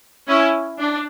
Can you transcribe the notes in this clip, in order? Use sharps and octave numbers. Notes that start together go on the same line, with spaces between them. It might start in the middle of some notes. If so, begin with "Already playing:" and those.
C#4 E4
D4